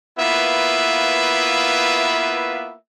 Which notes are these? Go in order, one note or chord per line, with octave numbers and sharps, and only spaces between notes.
A#3 B3 E4 F4 B4 E5